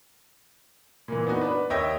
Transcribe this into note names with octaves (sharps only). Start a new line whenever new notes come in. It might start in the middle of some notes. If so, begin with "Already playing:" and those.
A#2 E3
B3 D4 D#4 F#4
D4 B4
D#2 C#5 D#5 E5 G5 A#6